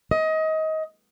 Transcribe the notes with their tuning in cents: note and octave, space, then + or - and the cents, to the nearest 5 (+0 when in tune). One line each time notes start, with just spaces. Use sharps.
D#5 +25